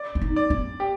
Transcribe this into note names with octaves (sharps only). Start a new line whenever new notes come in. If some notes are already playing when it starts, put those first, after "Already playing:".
Already playing: D5
D4
D#4
D5
D4
G4